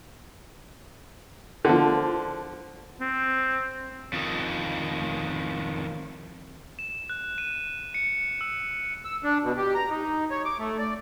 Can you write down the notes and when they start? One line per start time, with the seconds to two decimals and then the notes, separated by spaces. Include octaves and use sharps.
1.65 D3 F3
3.00 C4
4.13 F2 D#3
6.79 E7
7.09 F#6
7.38 D#7
7.94 C#7
8.41 E6
9.05 E6
9.24 D4
9.43 B2
9.57 G4
9.74 A#5
9.90 D#4
10.31 C#5
10.45 D6
10.59 A3
10.79 D5